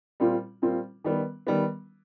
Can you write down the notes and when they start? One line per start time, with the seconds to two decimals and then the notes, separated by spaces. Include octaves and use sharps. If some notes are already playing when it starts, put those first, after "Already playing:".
0.20 A#2 G3 C4 F4
0.62 A#2 G3 C4 F4
1.04 D#3 G3 B3
1.47 D#3 G3 B3